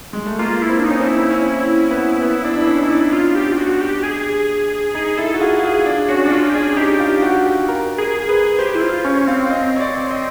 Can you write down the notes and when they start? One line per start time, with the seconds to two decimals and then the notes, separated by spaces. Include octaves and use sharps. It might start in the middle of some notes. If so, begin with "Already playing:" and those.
0.13 G#3
0.26 A3
0.39 A#3 F4
0.62 E4
0.70 C4
0.79 D4
0.85 D#4
0.90 C#4
1.00 C4
1.07 E4
1.24 C4
1.30 C#4
1.91 B3
2.21 B3
2.44 D4
2.56 D4
2.67 C#4
2.82 D#4
2.90 D4
3.12 F4
3.35 G4
3.52 F4
3.58 F#4
3.81 G4
4.03 G#4
4.95 D#4 G#4
5.17 E4 A4
5.34 F#4
5.40 F4 G#4
5.53 F#4
5.63 F4 G#4
5.86 D4
6.09 C#4 F#4
6.26 D4
6.31 C#4 F4
6.50 G4
6.54 D4 G#4
6.77 D#4 G4
7.00 F4
7.22 F#4
7.46 G4
7.68 A#4
7.98 G#4 A#4
8.29 G#4 B4
8.59 G4 C5
8.75 E4
8.81 F4 C5
9.05 C#4 C#5
9.27 C4 F5
9.50 D#5
9.76 C#5
9.80 D5
10.11 D#5